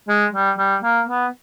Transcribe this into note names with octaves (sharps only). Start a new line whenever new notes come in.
G#3
G3
G3
A#3
B3